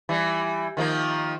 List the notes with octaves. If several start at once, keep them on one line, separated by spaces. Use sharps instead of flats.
E3 G3
D#3 F3 A#3